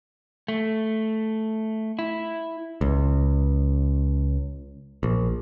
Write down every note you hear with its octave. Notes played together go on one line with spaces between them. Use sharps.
A3
E4
C#2
A#1